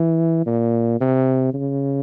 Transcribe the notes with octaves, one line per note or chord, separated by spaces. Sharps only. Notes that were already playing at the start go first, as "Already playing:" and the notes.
Already playing: E3
A#2
C3
C#3